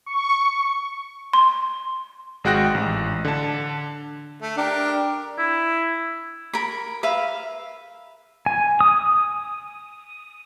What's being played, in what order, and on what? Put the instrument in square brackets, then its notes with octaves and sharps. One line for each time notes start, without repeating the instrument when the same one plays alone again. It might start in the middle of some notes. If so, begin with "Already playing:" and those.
[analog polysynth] C#6
[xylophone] C6
[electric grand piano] G#1 G#3 F#4 G5 F#6 A#6
A1
D3 A5
[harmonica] A3
[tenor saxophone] D4 [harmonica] G4 A#4
[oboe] E4
[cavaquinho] A#4 B5
B4 E5 F5
[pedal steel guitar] G#5
D#6